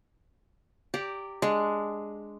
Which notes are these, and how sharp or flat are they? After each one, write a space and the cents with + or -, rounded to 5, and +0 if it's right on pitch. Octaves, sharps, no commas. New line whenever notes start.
G4 +0 D5 -20 A#5 -25
G#3 +0 D4 +0